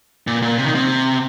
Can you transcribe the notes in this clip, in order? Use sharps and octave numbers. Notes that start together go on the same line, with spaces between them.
A#2
A#2
C3
D#3
C3